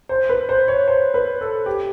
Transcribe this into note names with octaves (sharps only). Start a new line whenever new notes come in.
C5
B4
C5
C#5
C5
B4
A4
G4